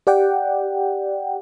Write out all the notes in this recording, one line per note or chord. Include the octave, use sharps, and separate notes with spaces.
G4 D5 F#5 G5